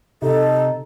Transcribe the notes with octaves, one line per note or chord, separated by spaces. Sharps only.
C3 D#4 A4